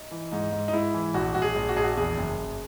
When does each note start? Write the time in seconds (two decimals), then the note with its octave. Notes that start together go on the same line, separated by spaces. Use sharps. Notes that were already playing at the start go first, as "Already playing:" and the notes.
Already playing: D#4
0.11 E3
0.32 G#2 D#4
0.52 G#2
0.68 D#4
0.73 G#2 E4
0.94 E3
1.14 A#1 F#4
1.34 A#1 F#4
1.42 G#4
1.55 A#1
1.69 F#4
1.76 A#1 G#4
1.84 F#4
1.97 E2 G#4
2.18 F#1
2.37 F#1